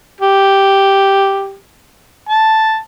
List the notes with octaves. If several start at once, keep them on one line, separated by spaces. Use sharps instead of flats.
G4
A5